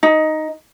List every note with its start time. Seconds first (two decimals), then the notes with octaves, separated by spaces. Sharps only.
0.03 D#4